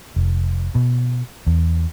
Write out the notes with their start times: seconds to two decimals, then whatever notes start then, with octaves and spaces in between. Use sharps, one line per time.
0.16 F1
0.75 B2
1.47 E2